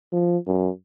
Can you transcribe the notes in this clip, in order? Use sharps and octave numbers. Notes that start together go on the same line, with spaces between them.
F3
F#2